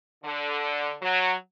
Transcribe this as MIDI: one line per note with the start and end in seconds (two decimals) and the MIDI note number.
0.24 0.94 50
1.01 1.32 54